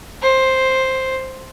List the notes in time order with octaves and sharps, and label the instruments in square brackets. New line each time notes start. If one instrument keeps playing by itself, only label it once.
[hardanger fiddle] C5